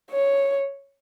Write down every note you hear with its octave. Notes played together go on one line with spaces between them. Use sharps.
C#5